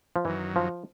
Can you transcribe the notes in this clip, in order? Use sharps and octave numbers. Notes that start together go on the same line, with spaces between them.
F3
F#2 D#3 E3 F#3
F3